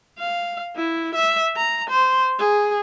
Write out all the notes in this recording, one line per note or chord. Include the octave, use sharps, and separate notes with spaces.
F5
E4
E5
A#5
C5
G#4